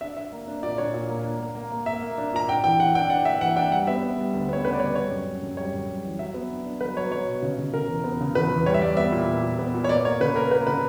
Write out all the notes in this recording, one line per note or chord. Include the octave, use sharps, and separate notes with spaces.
D4 E5
D4 E5
A#3
D4
A#2 D5
D4 C#5
A#2
A#3
D4
A#3
A#3
A#3
A#3 E5
A#3
D4
A#2 A#5
D4 G5
E3 G5
E3 F#5
D4 G5
D4 F#5
A#3 E5
E3 F#5
D4 G5
G3 F#5
B3 E5
B3
G3
D2
B3 C#5
C#3 B4
D5
G3 C#5
G3 C#5
F#2
C#4
F#2
G3 C#5
F#2
G3
E3
F#3 E5
B3
D4
D4
F#3 B4
F#3 C#5
F#3 C#5
B2
C#3
C#3
C#3 A#4
E2
B3
C#3
E2 B4
E2
G3 C#5
E5
G3 D5
B3 E5
A#2
A#2
A#2
B3
A#2
C#5
A#3 D5
A#3 C#5
C#3 B4
A#3 A#4
A#3 B4
C#3 B4